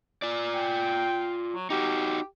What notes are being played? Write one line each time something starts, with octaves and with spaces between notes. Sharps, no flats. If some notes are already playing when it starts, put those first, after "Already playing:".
F4 D5
G5
F#3
D#4 F#4 G4